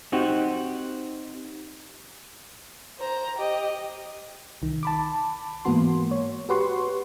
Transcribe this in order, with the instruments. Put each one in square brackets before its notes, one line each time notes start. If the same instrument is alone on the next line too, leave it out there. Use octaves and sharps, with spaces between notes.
[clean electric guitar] C4 D#4 F#4 G4 C5
[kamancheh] C5 A#5
G4 D#5
[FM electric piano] C2 D#3
A5 B5 D6
G#2 E3 A#3 B3 F#4 C6
C#5
F#4 G4 B4 F#5 C6 C#6